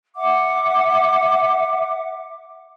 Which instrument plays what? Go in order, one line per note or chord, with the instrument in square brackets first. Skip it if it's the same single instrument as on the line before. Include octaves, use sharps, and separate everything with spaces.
[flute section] E5 F#5 D6